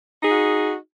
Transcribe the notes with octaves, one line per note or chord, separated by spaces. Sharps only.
D#4 F#4 G#4